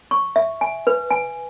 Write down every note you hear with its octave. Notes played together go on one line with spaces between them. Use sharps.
C#6
E5
G#5
B4
G#5